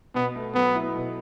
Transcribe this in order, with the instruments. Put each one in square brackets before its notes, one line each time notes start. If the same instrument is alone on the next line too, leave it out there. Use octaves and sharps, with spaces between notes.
[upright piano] B2 [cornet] B3
[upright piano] A3
[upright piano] F#3 [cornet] B3
[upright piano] E4
B2